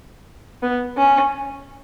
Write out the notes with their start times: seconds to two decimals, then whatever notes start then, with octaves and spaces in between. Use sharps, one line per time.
0.63 B3
0.98 C#4